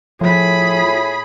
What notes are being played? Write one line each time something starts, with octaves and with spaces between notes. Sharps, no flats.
A2 F3 F4 G#4 B5